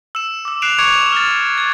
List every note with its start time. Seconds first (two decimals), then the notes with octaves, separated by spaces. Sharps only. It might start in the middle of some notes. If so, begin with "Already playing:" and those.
0.15 E6 E7
0.45 D6 E6
0.62 F#6 C7 D7 E7 F7
0.79 C#6 D6 G#6 C#7 D7 F7
1.12 F6 A6
1.58 G#6